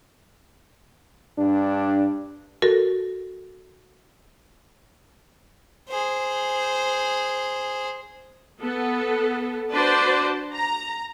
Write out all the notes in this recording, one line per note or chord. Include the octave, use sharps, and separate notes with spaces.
G2 D4
F#4 A4 A#4
G#4 C5
B3 A4
D4 F#4 B4 C5 D5 A5
A#5